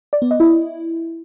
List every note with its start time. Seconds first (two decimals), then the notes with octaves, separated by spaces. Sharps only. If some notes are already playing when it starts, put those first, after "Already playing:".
0.13 D5
0.22 B3
0.31 D#5
0.40 E4